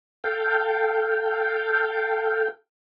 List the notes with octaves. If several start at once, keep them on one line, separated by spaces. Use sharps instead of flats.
A4 F5 G5